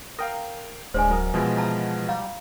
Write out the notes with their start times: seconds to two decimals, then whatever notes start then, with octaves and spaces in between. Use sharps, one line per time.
0.19 A#4 F5 G5 D#6
0.94 D1 G#3 D4 C5 G#5
1.10 F#3 A#4 D#6
1.34 B2 E3 F3 G#3
1.57 E5 A5 A#5
2.08 G3 F5 A#5